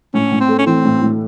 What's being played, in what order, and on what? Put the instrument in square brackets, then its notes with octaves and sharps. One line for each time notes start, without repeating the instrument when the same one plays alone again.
[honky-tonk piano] A2 [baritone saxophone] C#4
[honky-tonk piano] A2
[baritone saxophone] C4
[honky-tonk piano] A3
[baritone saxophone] C#4
[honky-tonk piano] E3 [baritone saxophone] C4
[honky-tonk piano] A2
A2